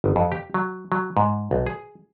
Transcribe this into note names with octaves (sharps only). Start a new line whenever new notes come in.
G1
F2
G4
F#3
F#3
G#2
B1
G#4